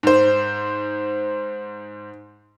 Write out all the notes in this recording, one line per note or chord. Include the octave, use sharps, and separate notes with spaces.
G#2 C5